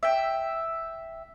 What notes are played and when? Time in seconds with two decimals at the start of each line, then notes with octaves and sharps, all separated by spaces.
0.03 E5 G5